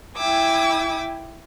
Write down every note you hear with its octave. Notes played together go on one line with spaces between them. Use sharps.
E4 G5 G#5 D6 E6